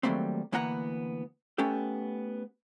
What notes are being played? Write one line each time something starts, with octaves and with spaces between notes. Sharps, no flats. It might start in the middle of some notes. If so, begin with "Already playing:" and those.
D#3 F#3 G3 A3 A#3 C4
D2 E3 A#3 B3 F#5 A#5
A3 B3 C#4 G4 A4